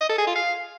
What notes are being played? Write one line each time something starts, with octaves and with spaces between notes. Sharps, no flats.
D#5
A4
G#4
F4
F5